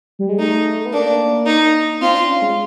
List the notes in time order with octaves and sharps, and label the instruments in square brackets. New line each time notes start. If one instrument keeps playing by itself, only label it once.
[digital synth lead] G3
G#3
[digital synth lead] A3 [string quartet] D#4
[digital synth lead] B3
[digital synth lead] A#3 [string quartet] D4
[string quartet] D#4
[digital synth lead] C4 [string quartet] F4
[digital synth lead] D4
C#4
G#3